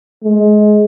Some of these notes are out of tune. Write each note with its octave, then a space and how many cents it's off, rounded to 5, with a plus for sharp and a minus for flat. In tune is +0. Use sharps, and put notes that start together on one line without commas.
G#3 +20